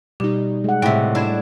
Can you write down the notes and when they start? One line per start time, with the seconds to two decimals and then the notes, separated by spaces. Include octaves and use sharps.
0.20 B2 G3 D#4 G4
0.64 G#3 F#5
0.82 A2 C3 E5 G5
1.15 G3 D4 E4 G#6 E7